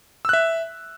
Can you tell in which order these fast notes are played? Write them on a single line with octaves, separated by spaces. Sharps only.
E6 F#6 E5